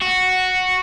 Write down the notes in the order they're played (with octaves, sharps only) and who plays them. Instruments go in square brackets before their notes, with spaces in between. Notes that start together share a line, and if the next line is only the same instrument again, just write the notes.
[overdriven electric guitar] F#4